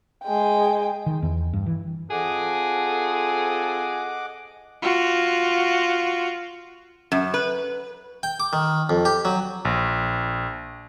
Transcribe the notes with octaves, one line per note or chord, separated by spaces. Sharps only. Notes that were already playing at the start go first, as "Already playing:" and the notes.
G#3 G5
D#3
E2
G2
E3
C4 F4 G#4 A4 D#5 F#5 D6
F4 F#4
F#2
B4
G5
D6
D#3
F2
G4
F#3
A#1